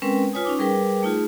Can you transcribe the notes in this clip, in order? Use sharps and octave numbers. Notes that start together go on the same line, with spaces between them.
G#3 C4 C#4 A#4 B4 G5
F4 B4 C#5 G#5 D#6
C#4 D#4 D6
G3 G#4 A#4 B4 G5 D6
A3 D#4 F4 G#4